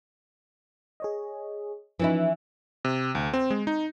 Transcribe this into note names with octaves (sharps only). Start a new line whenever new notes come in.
G#4 C#5 D#5
E3 F3 C#4 D#4 E4
C3
D2
C4
G#3
D#4